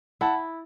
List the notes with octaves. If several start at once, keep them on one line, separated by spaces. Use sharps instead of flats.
E4 F#5 A5